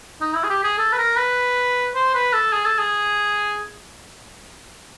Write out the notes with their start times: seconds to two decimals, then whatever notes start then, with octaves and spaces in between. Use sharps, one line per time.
0.21 D#4
0.35 E4
0.44 G#4
0.49 G4
0.64 G#4
0.79 A4
0.93 B4
0.98 A#4
1.17 B4
1.95 C5
2.14 B4
2.33 A4
2.53 G#4
2.66 A4
2.79 G#4